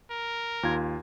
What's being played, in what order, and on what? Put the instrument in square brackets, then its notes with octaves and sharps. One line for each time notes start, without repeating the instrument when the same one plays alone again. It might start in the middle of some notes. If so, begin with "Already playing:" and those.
[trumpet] A#4
[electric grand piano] D#2 F4 G#6